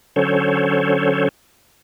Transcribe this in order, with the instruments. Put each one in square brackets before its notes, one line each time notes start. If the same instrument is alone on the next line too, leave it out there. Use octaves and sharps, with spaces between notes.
[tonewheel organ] D3 F#3 C#4 A4 C5 C#5